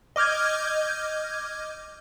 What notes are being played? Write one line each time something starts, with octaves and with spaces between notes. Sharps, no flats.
D#5 D6 F6 G6 G#6